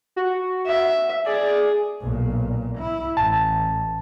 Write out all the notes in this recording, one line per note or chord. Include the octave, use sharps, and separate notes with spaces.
F#4
E5
G#4 D5
B1 A#2
E4
A1 A5